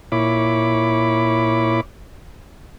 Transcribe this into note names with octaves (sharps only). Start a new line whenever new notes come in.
A#2 E4 C#5 B5 D6